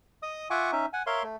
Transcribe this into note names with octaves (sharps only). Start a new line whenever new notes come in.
D#5 D#6
F4 E5 F#5 G#5 C#6 D6
C#4 D#4 E5
F#5 G#5
A#4 C#5 E5 F5 C6
A3